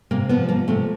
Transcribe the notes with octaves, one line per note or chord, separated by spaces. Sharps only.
C3 A#3
F3 B3
F3 A#3
C3 A3